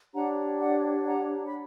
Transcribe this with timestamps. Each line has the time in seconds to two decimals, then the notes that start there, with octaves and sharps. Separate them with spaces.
0.14 D4 G4 C#5 F#5 A#5
0.60 D5 F#5
1.06 F#5 A#5
1.46 B5